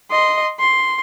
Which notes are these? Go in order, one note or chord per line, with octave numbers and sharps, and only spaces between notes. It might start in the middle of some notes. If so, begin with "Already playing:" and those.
D#5 C6
C6